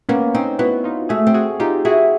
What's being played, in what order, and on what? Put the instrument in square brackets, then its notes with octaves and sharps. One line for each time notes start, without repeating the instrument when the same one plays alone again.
[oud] A#3 [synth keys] B3 C#4
[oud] C4 [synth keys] C#4 D#4
[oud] B3 [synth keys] E4 F#4
[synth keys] D#4 F4
[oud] A3 [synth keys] F#4 G#4
[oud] C4
[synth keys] F#4 G#4
[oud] D#4 [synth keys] F4 G4
[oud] E4 [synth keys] F#4 G#4